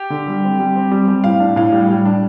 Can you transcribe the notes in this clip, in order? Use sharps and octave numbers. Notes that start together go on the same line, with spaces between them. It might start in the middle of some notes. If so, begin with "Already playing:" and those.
Already playing: G4
D3
G3
C4
G3
C4
G3
G3
A2 F5
D4
A2 F5
G3
G3
D4